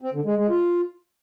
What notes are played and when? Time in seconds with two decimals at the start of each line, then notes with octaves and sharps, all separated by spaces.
0.02 C4
0.13 D3
0.25 G#3
0.37 G#3
0.49 F4